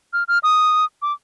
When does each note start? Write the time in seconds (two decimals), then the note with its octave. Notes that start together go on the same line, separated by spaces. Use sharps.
0.13 F6
0.28 F6
0.43 D#6
1.02 D6